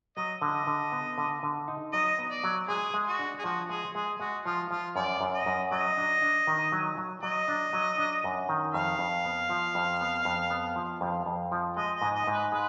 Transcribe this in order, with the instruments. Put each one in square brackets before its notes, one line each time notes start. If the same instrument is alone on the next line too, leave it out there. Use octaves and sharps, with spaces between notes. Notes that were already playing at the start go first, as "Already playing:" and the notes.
[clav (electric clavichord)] F#3 [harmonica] D#5
[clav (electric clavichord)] D3 [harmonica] D#5
[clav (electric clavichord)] D3
B3
D3
D3
D#4
[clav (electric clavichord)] F#3 [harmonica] D#5
[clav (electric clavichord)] B3
[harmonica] D5
[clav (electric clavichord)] F#3
[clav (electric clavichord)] G#3 [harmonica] G#4
[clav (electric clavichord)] G#3
[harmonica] F#4
[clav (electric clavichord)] D4
[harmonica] G#4
[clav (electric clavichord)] F3 [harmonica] F#4
[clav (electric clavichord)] G#3 [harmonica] G#4
[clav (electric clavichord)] G#3 [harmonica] G#4
[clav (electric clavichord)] G#3 [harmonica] F#4
[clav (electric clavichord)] F3 [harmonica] F4
[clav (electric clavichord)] F3 [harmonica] F4
[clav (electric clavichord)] F#2 [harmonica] D5
[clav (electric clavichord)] F#2
[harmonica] D#5
[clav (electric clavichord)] F#2
[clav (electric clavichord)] F#3 [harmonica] D#5
[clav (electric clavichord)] D4
D4
D#3
F#3
F#3
[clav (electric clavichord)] F#3 [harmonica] D#5
[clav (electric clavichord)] D4
F#3
D4
F#2
D#3
[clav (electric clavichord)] F2 [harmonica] F5
[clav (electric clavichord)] F2
B3
F3
F2
B3
F2
B3
F3
F2
F2
F3
[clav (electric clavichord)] G#3 [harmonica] D#5
[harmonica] D#5
[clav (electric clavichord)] G#2
[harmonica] D#5
[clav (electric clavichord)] G#2
[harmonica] B4
[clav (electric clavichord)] G#3 [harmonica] B4